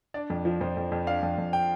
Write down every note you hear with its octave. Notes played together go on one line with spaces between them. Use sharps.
D4 D5
F2
F3
F2 C5
F2
F2
D4 F5
F2
F2
G5